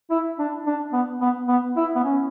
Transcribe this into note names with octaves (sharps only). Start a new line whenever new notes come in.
E4
D4
D4
B3
B3
B3
E4
B3
C#4